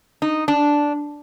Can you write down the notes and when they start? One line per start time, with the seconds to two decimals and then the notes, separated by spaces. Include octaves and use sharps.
0.22 D#4
0.48 D4